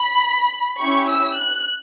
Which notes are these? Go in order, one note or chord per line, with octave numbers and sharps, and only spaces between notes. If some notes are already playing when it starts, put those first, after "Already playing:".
Already playing: B5
C#4 E4 G4 C#6
E6
F#6